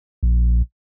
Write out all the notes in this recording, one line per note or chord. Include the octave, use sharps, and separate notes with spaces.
A#1